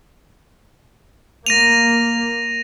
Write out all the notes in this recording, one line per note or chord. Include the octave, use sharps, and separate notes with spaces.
A#3 A#6 D#7 F7